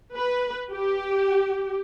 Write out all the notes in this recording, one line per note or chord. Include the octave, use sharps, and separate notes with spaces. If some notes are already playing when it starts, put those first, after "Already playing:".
B4
G4